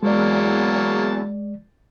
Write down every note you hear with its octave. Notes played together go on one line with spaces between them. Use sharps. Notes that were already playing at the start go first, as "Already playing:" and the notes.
E2 F#3 G#3 A#3 D5 A5